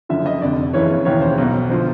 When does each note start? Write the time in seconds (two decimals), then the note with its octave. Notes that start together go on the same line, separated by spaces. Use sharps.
0.09 F#1 F#2 D3 F3 E5
0.26 D#5
0.42 F1 F2 D3 D5
0.73 F#1 F2 C#3 E3 C#5
1.05 E1 D#2 C#3 E3 C#5
1.21 C5
1.38 B1 B2
1.70 D3 F3 C5